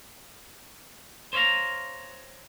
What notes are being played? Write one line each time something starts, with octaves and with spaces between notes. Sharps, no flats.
C5 C#5 D#5 F5 A#5